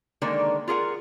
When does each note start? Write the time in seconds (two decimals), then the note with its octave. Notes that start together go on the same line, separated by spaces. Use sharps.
0.22 D3 D#3 G#3 A#3 D5
0.68 F4 G#4 A#4 F#5